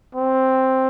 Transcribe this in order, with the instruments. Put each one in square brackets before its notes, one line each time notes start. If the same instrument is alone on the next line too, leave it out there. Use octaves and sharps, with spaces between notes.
[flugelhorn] C4